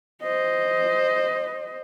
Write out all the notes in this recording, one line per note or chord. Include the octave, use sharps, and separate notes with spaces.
C5 D#5